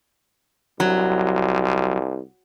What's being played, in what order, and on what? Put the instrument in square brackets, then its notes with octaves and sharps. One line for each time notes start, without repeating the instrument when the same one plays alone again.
[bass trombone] C2 [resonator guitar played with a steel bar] F#3